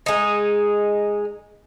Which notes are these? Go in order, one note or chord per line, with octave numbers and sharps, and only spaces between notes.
G#3 D#4